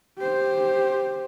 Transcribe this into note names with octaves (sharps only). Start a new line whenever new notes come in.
G4 C5